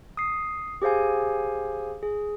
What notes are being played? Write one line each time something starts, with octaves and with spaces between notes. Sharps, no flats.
D#6 C7
G4 G#4 C5 F5 G#5
G#4